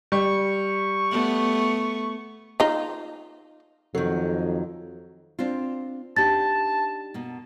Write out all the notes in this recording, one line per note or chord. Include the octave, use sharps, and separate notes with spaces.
G3 C#6
A3 B3
D#4 F4
F2 D#3 F#3 A4
C4 D4 F4
D4 D#4 G4 A5 A6
B2 A#3